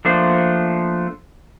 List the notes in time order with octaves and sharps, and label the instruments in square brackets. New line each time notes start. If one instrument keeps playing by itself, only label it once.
[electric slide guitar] F3 A3 A#3 D4 C5